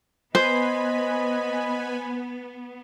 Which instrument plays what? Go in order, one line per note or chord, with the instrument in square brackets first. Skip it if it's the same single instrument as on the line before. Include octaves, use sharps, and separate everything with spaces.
[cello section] B3 [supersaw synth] B4 G#5 B5 [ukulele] C5 [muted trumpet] D#5